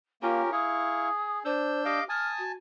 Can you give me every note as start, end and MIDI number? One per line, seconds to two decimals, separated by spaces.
0.22 0.42 58
0.22 0.51 61
0.22 0.52 65
0.22 0.51 67
0.22 0.51 70
0.22 0.42 77
0.52 1.09 64
0.52 1.43 68
0.52 1.09 77
0.52 1.09 85
0.52 1.38 87
1.45 1.99 62
1.45 1.83 72
1.45 1.99 88
1.45 1.99 91
1.85 2.07 67
1.85 2.04 75
1.85 2.04 77
1.85 2.04 86
2.09 2.52 80
2.09 2.52 81
2.09 2.42 87
2.09 2.27 89
2.38 2.55 66